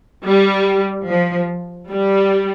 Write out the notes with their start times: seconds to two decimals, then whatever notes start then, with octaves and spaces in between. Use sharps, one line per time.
0.23 G3
1.07 F3
1.90 G3